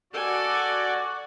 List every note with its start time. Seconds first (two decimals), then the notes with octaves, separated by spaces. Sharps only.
0.13 F#4 A4 D5 G#5